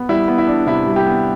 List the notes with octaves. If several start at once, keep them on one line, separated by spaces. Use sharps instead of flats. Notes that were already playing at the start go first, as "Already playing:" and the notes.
Already playing: B3
G3 E4
B3
E4
D4
C3 E4
G3
G4
B3